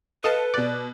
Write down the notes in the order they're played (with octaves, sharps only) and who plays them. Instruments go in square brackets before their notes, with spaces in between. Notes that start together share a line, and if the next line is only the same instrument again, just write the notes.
[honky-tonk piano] A4 [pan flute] B4 [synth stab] D#5 F5 A5
[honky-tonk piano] B2 F#6 [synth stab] D5